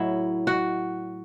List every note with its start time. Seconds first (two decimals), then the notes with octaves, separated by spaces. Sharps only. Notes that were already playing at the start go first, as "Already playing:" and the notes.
Already playing: A2 F#3 E4
0.47 F#4